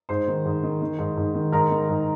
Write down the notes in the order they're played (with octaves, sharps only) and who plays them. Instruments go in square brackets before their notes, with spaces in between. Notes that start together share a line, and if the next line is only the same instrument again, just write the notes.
[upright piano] G#2 C5 C6
D#3
G#2
D#3
D#3
G#2
G#2
D#3
G#2 A#4 A#5
D#3
G#2